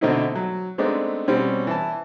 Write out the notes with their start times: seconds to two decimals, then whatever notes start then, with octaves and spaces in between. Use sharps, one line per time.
0.01 B2 D3 A3 C4 D#4 E4
0.35 F#3
0.78 G#3 A3 B3 C4 D4 D#4
1.28 B2 G3 C4 C#4
1.67 E3 A5